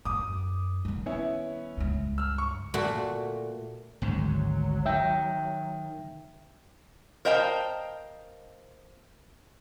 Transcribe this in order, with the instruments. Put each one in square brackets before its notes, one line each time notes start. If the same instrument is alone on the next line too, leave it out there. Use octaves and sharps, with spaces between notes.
[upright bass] F#2 [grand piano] D6 D#6
[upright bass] D#3 G3
[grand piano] B3 C#4 E4
[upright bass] C#2 G2
[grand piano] E6 F6
C#6
[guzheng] A#2 A3 F#4
[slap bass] G#1 D2 G#2 [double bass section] F#3
[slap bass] D#3 [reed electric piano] E5 G5
[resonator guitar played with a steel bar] A#4 C5 D#5 F5 G5 A5